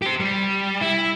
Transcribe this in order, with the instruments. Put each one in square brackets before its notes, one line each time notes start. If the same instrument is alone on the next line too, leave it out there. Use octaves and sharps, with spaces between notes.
[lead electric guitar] G4 C5
G3
E4